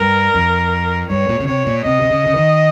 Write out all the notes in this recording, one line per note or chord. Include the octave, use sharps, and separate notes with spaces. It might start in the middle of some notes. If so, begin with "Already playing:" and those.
Already playing: G2 A#4
F2
G2 C#5
A#2
C#3
C3 C#5
A#2
C3 D#5
C3
C#3
C#3
D#3